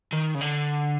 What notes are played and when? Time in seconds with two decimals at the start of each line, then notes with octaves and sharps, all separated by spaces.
0.12 D#3
0.34 C#3
0.41 D3